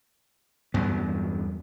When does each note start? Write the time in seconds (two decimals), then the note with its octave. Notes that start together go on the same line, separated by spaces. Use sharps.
0.74 E2 G2 F#3 B3